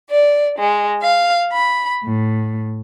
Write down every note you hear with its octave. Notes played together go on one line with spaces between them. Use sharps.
D5
G#3
F5
B5
A2